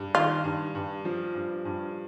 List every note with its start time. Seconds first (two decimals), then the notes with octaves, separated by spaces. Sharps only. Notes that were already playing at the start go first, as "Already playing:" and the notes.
Already playing: G2
0.14 D#3 F4
0.44 G2
0.75 G2
1.05 F3
1.35 G2
1.65 G2